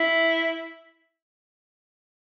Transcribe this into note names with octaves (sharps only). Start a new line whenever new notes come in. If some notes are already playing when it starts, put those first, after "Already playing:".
Already playing: E4